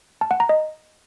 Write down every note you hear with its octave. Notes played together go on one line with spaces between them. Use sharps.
A5
F#5
A#5
D#5